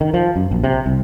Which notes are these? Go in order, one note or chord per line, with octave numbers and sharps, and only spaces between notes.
D#3
F3
F#2
A#1
C3
C2